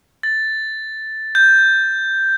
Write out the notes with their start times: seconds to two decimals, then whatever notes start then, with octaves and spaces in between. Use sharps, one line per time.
0.23 A6
1.35 G6